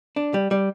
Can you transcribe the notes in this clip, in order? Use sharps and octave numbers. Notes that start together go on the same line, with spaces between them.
D4
G3
G3